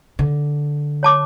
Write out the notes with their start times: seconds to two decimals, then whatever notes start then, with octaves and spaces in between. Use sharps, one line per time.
0.19 D3
1.03 C#5 A5 D6